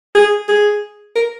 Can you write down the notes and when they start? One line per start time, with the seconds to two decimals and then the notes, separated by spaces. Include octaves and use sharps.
0.15 G#4
0.49 G#4
1.16 A#4